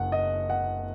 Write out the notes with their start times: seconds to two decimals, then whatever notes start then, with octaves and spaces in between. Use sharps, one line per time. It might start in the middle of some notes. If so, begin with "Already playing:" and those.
Already playing: F#1 F#5
0.12 D#5
0.50 F#5